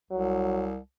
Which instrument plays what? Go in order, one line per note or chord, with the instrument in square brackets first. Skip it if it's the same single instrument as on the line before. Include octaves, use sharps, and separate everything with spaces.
[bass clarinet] C2 [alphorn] F#3